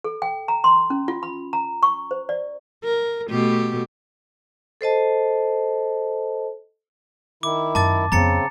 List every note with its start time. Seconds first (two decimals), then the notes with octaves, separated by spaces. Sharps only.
0.04 A4
0.22 G5
0.48 A#5
0.64 C6
0.90 C#4
1.08 F4
1.23 B5
1.53 A#5
1.83 C#6
2.11 C5
2.29 D5
2.84 A#4
3.30 B2 A3 G4
4.81 A4 C5 D#5 A5
7.43 D#3 E4 D6
7.75 F#2 A5 D6 A6
8.12 F2 C#3 B3 C4 A#5 A6 C#7